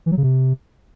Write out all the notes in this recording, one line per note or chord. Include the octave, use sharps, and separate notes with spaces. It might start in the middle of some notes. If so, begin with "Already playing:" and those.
E3
F#3
C#3
C3